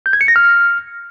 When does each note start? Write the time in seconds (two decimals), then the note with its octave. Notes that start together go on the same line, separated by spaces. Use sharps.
0.06 G6
0.13 G#6
0.21 C#7
0.28 A#6
0.36 F6